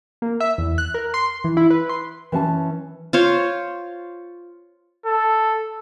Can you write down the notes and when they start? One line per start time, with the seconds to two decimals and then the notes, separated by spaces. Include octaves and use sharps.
0.22 A#3
0.40 E5
0.58 E2
0.78 F#6
0.94 A#4
1.14 C6
1.44 E3
1.57 E4
1.70 B4
1.89 C6
2.32 E3 C#4 A5
3.13 F4 C5 C#5 F5
5.06 A4